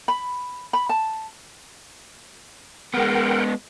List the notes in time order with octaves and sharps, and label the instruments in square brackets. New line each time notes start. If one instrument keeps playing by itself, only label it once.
[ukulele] B5
B5
A5
[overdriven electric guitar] G#3 B3 [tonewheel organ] A#4 F#5 G5